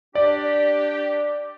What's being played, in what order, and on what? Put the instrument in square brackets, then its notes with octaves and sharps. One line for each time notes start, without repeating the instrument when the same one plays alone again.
[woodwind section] D4 G4 [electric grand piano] D5